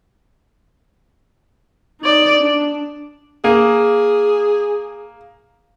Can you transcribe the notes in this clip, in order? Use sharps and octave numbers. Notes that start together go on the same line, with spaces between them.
D#4 D5
D4
A#3 G#4